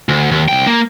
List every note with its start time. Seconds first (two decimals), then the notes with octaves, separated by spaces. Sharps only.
0.09 D2
0.31 D#2
0.48 C2 G5
0.67 A#3